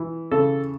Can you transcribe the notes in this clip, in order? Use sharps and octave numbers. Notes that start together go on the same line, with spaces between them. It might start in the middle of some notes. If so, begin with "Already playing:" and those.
Already playing: E3
C#3 A4